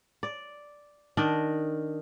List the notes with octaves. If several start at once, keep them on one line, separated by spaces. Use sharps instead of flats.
D5
D#3 D4 D5 D#5